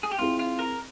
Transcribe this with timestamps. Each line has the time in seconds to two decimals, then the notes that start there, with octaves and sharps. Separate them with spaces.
0.03 G#4
0.11 G4
0.18 C4 E4 F4 G#4
0.39 F4
0.59 A#4